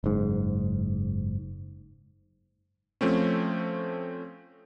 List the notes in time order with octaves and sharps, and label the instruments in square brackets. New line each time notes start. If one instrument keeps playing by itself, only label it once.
[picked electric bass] F#1 G#2
[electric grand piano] F3 A3 C4 C#4